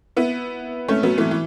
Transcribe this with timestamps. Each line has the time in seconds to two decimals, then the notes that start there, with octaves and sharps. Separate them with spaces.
0.16 B3 E4
0.88 A3 C#4
1.03 F#3 B3
1.18 E3 A3
1.31 E3